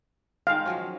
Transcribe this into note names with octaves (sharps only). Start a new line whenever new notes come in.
D#3 G#3 A4 F5
F3 F#3 C#4